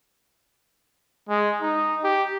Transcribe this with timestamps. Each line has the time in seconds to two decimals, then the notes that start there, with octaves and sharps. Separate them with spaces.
1.29 G#3
1.61 D#4
2.04 G4